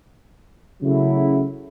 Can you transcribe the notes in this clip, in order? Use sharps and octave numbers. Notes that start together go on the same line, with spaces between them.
C#3 F#3 A3 E4